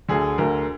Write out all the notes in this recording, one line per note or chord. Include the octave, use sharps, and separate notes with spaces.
D2 D3 G#4
D2 D3 A#4